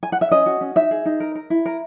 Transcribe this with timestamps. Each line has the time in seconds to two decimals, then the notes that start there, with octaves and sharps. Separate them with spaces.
0.03 G#5
0.12 F#5
0.21 E5
0.31 C#4 D#5
0.46 F#4
0.61 C#4
0.75 D#4 E5
0.91 G#4
1.06 D#4
1.20 A#4
1.35 A#4
1.50 E4
1.66 A#4